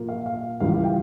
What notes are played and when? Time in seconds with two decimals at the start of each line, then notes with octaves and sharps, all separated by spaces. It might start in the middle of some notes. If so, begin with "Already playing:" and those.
Already playing: A#2 F3 A#3
0.09 F5
0.26 F5
0.60 C#2 C#3 E3 G3 F5
0.72 F5
0.84 G5